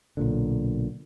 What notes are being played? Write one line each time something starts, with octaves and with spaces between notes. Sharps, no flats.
B1 A#2 D3